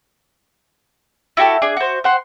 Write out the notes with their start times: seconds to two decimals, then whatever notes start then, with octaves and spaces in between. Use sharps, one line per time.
1.37 E4 F#4 G4 A4
1.62 D4 G#4
1.77 F#4 C5
2.04 C5 F#5 C6